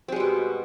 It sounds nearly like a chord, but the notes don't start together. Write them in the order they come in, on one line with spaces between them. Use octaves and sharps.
C4 G#3 G3 B2